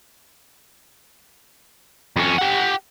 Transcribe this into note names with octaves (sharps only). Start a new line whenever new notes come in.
F2 C#4
G4 F#5